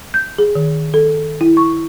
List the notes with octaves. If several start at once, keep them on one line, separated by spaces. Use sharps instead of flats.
G6
G#4
D#3
A4
E4
C#6